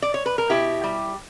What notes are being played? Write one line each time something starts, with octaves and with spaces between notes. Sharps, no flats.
D5
C#5
B4
A#4
B2 E4 G4
G3